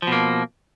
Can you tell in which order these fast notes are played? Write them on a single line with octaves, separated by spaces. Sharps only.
F3 B2 A#3